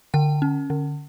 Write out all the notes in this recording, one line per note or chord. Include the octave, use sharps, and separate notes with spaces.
D3 G5
C#4
D3